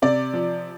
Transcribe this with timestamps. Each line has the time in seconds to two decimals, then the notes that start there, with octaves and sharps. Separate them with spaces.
0.02 C3 D5
0.34 F3